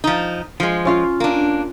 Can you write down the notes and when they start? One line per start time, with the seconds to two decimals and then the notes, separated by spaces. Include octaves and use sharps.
0.04 F3 D#4
0.60 F3 G#3
0.85 C#4 F4 F5
1.20 A#3 D4